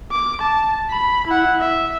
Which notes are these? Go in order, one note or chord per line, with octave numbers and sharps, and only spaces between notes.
D6
A5
B5
E4 F#5
E5